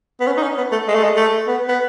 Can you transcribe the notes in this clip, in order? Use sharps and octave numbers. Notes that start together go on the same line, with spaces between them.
B3
C#4
D#4
C#4
B3
A3
G#3
A3
G#3
A3
B3
B3